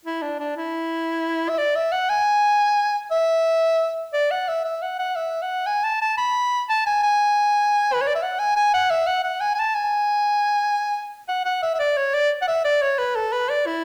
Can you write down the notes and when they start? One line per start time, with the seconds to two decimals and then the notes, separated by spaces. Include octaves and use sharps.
0.05 E4
0.22 D4
0.40 D4
0.57 E4
1.49 E5
1.58 D5
1.76 E5
1.92 F#5
2.09 G#5
3.11 E5
4.13 D5
4.31 F#5
4.48 E5
4.64 E5
4.82 F#5
4.99 F#5
5.16 E5
5.42 F#5
5.67 G#5
5.84 A5
6.01 A5
6.18 B5
6.69 A5
6.86 G#5
7.03 G#5
7.93 B4
8.01 C#5
8.07 D5
8.15 E5
8.22 F#5
8.39 G#5
8.56 G#5
8.74 F#5
8.90 E5
9.07 F#5
9.24 F#5
9.41 G#5
9.55 G#5
9.59 A5
9.75 G#5
11.28 F#5
11.45 F#5
11.62 E5
11.74 E5
11.79 D5
11.97 C#5
12.14 D5
12.42 F#5
12.48 E5
12.65 D5
12.82 C#5
12.98 B4
13.16 A4
13.33 B4
13.49 D5
13.66 E4